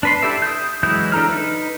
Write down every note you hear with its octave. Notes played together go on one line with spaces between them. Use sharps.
D4 B4 C6
E4 G4 A4 D5 E5
D#6 G6
E3 F#3 G#3 E4 G6
D4 A4 A#5 F6
D#4 B4